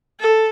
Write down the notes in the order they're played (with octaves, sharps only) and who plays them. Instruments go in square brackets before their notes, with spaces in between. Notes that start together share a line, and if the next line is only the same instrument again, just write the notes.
[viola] A4